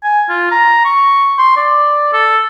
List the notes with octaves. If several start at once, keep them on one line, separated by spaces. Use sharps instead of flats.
G#5
F4
A#5
C#6
C6
D5
A4